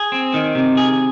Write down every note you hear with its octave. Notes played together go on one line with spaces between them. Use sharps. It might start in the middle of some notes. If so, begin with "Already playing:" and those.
Already playing: G#4
C4
D#3
C3
G#4